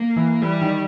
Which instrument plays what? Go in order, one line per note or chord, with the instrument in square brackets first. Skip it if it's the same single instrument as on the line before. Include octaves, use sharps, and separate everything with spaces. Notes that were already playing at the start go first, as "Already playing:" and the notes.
Already playing: [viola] A#3
[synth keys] E3
[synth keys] E3 [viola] G3
[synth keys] D#3